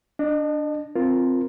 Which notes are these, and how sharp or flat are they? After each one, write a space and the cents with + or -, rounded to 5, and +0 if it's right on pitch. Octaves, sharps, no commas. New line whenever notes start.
D4 +0 D#5 -35
C4 -5 F4 +0 A#4 +0